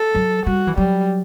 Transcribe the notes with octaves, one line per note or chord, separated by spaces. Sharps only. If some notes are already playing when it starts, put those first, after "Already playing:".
Already playing: A4
F#3
G3 F#4
E3
F#3 G3